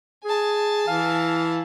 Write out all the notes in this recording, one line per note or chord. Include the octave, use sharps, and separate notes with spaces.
G#4 G#5 A5
E3 F5